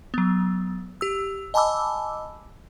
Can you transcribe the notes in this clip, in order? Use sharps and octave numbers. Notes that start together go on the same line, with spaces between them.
F#3 B3
G4 E6
D#5 G#5 A5 B5 D6 E6